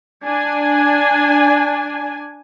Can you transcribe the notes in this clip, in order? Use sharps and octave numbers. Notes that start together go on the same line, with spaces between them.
D4 G#5